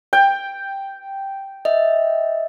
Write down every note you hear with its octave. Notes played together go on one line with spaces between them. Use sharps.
G5
D#5 E5